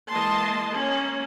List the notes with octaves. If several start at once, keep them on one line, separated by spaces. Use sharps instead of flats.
E3 G#3 A#3 D#5 A5 C6
A#3 C#4